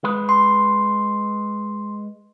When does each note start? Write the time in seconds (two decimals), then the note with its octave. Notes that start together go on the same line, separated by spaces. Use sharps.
0.04 G#3 B4
0.29 C6